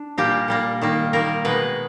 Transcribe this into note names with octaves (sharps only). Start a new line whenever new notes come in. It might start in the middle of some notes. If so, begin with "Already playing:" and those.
Already playing: D4
A#2 G3 A#3 G4
A#2 G3 A#3
D#3 G3 A#3
D#3 G3 A#3 A#4
B2 G#3 B4